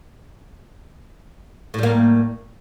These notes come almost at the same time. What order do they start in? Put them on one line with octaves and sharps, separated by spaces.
A2 G3 A#3